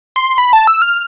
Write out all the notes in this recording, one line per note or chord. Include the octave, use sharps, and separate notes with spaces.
C6
B5
A5
E6
F6